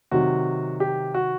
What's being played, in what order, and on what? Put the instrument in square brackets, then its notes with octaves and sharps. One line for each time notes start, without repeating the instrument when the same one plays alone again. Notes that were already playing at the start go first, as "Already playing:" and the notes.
[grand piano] C3 D#3 F#3 F#4
G4
F#4